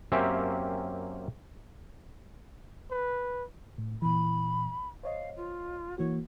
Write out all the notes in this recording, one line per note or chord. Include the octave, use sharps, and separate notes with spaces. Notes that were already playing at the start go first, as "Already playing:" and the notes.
F#2 A#3 C4 C#4 G4 E5
B4
A2
A#2 E3 B5
C5 C#5 D#5 F5
F4
E3 A#3 F#4 C#5